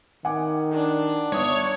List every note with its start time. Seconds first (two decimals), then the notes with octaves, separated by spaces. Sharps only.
0.25 D#3 F#5 G#5 D6
0.73 D4
1.32 G1 B3 C#5 D#6